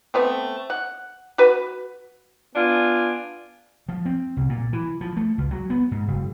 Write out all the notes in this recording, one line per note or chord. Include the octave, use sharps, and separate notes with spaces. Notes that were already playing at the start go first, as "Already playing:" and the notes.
A3 B3 C4
F#5
F#4 B4
B3 D4 F4 G#5
F3
C4
C2
A#2
E3
F3
A3
C#2
F#3
B3
G#2
F#1